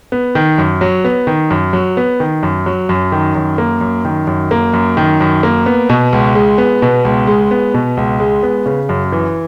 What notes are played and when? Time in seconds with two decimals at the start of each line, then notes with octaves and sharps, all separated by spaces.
0.12 B3
0.35 D#3
0.58 F#2
0.81 F#3
1.04 B3
1.27 D#3
1.50 F#2
1.73 F#3
1.97 B3
2.20 D#3
2.43 F#2
2.66 F#3
2.89 F#2
3.12 D#3
3.35 F#2
3.58 A#3
3.81 F#2
4.05 D#3
4.27 F#2
4.51 A#3
4.73 F#2
4.97 D#3
5.21 F#2
5.43 A#3
5.66 B3
5.89 B2
6.13 C#2
6.35 G#3
6.58 B3
6.82 B2
7.05 C#2
7.27 G#3
7.51 B3
7.74 B2
7.97 C#2
8.20 G#3
8.43 B3
8.66 C#3
8.89 F#2
9.12 E3